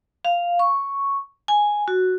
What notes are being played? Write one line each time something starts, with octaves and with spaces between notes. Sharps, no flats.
F5
C#6
G#5
F#4